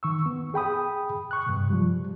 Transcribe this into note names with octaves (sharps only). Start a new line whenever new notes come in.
D#3 C#6 E6
B3
G#4 G5 B5 D#6
C#6 F#6
G2 C3
F3 G3